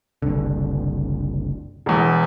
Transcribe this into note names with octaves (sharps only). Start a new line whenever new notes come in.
F#1 C2 D3
E1 E2